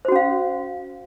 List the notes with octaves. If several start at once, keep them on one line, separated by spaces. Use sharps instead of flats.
C#4 F#4 C5 F5